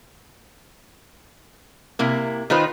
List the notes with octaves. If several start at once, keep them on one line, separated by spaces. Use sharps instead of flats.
C3 A#3 E4
D#3 D#4 F4 B4 C5